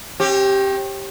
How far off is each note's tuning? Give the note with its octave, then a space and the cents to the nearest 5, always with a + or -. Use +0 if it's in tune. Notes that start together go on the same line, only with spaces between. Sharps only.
C#4 -40 G4 +0